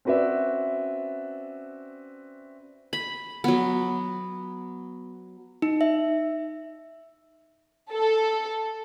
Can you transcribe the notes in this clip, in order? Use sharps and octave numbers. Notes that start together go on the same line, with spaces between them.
C4 C#4 F#4 B4 D5 E5
B5
F#3 B3
D#4
E5
A4